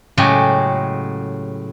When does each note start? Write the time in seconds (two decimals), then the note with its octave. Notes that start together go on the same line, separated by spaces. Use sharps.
0.17 A2 C#3 F#3 G#3 G4 G#5